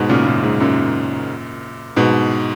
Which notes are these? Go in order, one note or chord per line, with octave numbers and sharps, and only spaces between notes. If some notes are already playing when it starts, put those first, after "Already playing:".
Already playing: G#2 B2
A#2 C#3
F#2 A#2
G#2
F#2 A#2
G#2 B2